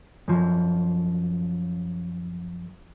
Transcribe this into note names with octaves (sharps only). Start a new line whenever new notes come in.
F#2 F3